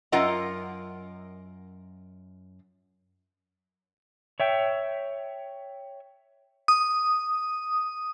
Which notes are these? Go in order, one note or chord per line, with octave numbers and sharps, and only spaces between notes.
F#2 F4 A#4 D#5 F#5 A#5
C#5 E5 G5
D#6